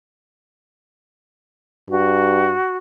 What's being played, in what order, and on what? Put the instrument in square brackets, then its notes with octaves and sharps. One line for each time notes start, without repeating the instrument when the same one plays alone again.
[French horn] G2 [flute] F#4